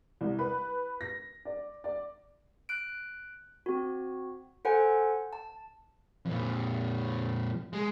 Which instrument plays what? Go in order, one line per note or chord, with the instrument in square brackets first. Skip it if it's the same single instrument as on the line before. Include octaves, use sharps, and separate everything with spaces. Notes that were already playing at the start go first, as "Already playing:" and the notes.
[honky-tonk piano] C2
B4
A#6
D5
D5
[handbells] F#6 D7
C4 F#4
A4 C5 F#5 G#5
A5
[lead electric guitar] F2 A#2
G#3